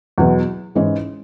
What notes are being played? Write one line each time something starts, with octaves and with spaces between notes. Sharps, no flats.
E2 B2 F#3 B3
G#2 E3 G#3 C#4